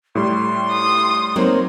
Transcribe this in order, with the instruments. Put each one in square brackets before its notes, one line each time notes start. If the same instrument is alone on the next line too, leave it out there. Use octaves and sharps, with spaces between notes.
[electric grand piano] A2 G3 [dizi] C6
[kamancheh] D#6
[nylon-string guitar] F#3 A#3 C4 [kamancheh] D#4